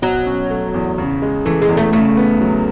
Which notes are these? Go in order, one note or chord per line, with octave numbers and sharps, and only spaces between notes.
B2 F#3
C#4
A3
E2
C#3
G#3
E3 A3
G#3
E2
A3
C#3 A3
B3
F#3